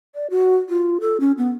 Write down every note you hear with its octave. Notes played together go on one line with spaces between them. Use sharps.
D5
F#4
F4
A4
C#4
B3